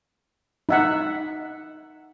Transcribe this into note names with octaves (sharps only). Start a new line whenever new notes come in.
D#4 E5 F#5